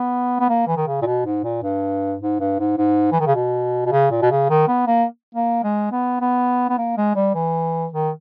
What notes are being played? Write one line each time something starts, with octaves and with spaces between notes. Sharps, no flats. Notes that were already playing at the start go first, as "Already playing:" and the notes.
Already playing: B3
B3
A#3
E3
D#3
C#3
A#2
B2
G#2
A#2
G2
G#2
G2
G#2
G#2
E3
D#3
C#3
B2
B2
C#3
A#2
B2
C#3
D#3
B3
A#3
A#3
G#3
B3
B3
B3
A#3
G#3
G3
E3
D#3